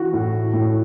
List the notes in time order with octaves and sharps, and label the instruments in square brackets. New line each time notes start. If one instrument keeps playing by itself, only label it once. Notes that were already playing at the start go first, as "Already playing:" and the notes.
Already playing: [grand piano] E3 F#4
A2
A2